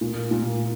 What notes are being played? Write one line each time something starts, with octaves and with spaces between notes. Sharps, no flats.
A#2
A#2